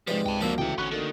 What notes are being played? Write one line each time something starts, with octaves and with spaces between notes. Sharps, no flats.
G#2 C3 F3 B4 D5
C#2 G5 A5
G1 F2 A#2 F3 F#3 A#3 D4 E5
D2 C#3 E3 E5 G5
A1 B3 C#4 C#6 F#6
D3 D#3 A#3 A4